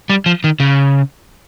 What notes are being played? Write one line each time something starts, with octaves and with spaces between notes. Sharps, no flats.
G3
F3
D#3
C#3